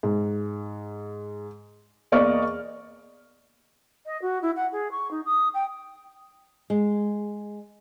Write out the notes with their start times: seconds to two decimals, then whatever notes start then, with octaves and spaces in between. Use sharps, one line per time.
0.03 G#2
2.12 E2 A#3 D5 D#5 C#6 F6
4.06 D#5
4.21 F#4
4.42 E4
4.56 F#5
4.72 G#4
4.91 C#6
5.10 D#4
5.25 D#6
5.53 G5
6.70 G#3